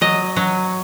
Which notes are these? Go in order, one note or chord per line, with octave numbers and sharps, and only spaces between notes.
F#3 D#5
F#3